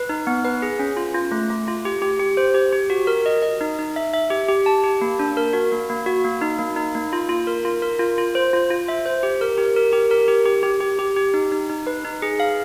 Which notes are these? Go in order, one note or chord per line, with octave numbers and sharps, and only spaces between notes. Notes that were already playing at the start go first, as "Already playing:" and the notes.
Already playing: B4
D#4
B3
B4
G#4
C#4
F4
F4
A3
A3
F4
G4
G4
G4
C5
G4
G4
F#4
A#4
D#5
D#5
D#4
D#4
E5
E5
G4
G4
A5
G4
A#3
D4
A#4
F#4
A#3
A#3
F#4
A#3
D#4
A#3
D#4
A#3
F4
F4
A#4
F4
A#4
F4
F4
C5
F4
F4
E5
C5
G4
A#4
G4
A#4
G4
A#4
G4
G4
G4
G4
G4
G4
D#4
D#4
D#4
B4
D#4
G#4
F5